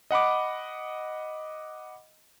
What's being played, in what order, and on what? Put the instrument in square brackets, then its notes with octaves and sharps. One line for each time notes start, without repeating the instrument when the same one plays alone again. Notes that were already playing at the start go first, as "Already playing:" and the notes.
[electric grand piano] D#5 F#5 B5 D6